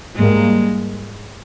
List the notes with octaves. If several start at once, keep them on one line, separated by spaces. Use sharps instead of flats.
G#2 G3 G#3 A#3